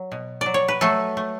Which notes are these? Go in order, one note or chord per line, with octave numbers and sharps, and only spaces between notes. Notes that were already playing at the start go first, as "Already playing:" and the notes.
Already playing: F#3
B2
F#3 D5
C#5
B4
F#3 A3 A4
A3